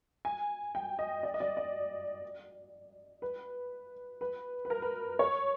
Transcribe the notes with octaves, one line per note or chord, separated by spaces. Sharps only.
G#5
G5
D#5
D5
D#5
D5
D5
B4
B4
B4
A#4
B4
C#5